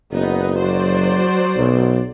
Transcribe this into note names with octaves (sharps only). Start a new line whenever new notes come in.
F#1 B3 D#4
F#3 C5 D5
B1